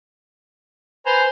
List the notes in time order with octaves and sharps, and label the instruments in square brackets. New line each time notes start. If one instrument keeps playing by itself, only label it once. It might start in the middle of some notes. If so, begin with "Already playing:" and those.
[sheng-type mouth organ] B4 G#5 A#5 [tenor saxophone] C5